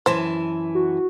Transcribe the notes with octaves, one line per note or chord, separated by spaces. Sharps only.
F#2 E3 C5 A5
F#4